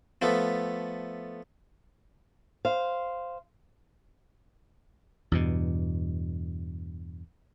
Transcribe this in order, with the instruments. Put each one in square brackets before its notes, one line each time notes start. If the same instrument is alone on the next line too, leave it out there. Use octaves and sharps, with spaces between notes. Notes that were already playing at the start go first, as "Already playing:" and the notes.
[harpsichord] F3 A3 B3
[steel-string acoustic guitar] C5 F5
[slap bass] E2 G2 B2